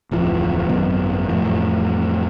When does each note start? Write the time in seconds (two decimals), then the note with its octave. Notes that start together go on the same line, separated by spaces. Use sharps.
0.11 D1 F2 E3 F3
0.69 G#1 F#2 B2
1.29 F2 A2 E3